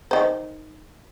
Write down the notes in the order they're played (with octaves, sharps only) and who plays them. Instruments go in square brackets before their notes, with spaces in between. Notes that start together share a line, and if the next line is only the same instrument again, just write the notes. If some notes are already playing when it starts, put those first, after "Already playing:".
[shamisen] D#3 C5